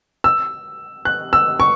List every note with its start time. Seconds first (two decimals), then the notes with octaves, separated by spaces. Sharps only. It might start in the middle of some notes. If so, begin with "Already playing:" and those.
0.24 E6
1.05 F#6
1.33 E6
1.60 C#6